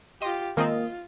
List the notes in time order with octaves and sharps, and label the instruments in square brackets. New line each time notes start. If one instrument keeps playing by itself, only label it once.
[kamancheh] F4 G4 [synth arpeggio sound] D#5 C6
[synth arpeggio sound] D#3 G#3 C4 [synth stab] A#3 D#5 [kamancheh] F4